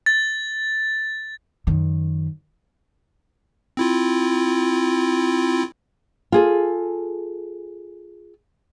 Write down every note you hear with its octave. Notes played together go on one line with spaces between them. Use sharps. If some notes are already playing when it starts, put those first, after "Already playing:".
A6
F#2 D#3
C4 E4 F4
F4 G#4 A4